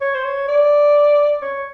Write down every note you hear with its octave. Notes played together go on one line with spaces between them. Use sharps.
C#5
C5
C#5
D5
C#5